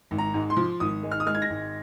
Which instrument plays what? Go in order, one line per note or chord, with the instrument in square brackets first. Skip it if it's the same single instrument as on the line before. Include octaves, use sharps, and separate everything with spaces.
[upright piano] G#1
A#5
G#2
C6
F3
G#1 D#6
G#3
F6
D#6
G#3 F6
G#6
A#6
G#1